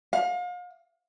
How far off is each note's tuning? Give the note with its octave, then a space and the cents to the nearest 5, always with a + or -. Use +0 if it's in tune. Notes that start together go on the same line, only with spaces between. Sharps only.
F5 +40